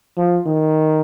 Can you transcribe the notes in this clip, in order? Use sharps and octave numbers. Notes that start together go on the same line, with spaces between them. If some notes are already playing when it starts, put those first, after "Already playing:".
F3
D#3